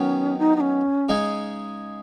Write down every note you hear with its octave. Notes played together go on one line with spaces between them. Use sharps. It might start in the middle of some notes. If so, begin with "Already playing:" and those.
Already playing: D#3 F#3 B3 C#4
D#4
D#4
C#4
C#3 G#3 D#4 G#4